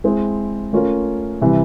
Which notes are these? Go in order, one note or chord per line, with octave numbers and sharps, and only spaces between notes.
G#3 C4 E4
A3 C#4 F4 A#4
C3 E3 G3